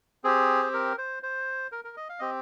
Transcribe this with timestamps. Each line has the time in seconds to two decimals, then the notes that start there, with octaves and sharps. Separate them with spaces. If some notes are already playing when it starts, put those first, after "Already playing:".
0.24 C4 G4 G#4
0.63 C5
0.74 A#4
0.98 C5
1.23 C5
1.72 A#4
1.84 A#4
1.97 D#5
2.09 F5
2.19 C4 G4 D#5